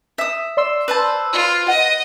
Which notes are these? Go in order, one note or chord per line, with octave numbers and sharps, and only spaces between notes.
E5 D#6
D5 C6 E6
B4 C5 A5
F4
D#5 F#5